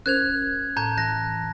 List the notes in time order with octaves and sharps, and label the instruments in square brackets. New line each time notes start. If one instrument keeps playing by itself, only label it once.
[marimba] C#4 A#4 C5 [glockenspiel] F#6 G#6 F7
[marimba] A2 [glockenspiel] A5 A#5 G6
[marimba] E3 [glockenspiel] F#6 A#6